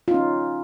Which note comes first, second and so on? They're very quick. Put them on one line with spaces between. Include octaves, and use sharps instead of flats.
F4 D#4 C#4